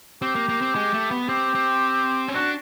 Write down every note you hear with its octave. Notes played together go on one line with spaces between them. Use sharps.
C4 G4
A#3
A#3
C4
G#3
A3
B3
C4 G4
C4
C#4
D4 F#4